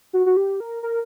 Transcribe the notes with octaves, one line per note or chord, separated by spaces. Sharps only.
F#4
F#4
G4
A#4
A#4